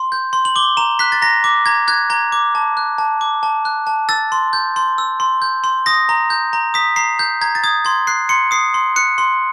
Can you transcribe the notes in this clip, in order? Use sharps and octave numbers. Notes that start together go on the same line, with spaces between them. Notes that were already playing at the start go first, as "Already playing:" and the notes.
Already playing: C6
G6
C6
F#7
D6 G7
A#5 E7
F#6 B6
A6
A#5 A#6
D6
A#5 G#6
F#6 G#6
A#5 G#6
D6
A5
F#6
A5
D6
A5
F#6
A5
E6 A6
C6
G6
C6
E6
C6
G6
C6
D#6 A#6
A#5
G6
A#5
D#6 B6
A#5 C7
G6
A#5 G#6
A6
D#6 G#6
C6 G#6
F#6 C7
C6 C#7
D#6 C7
C6
F#6 C#7
C6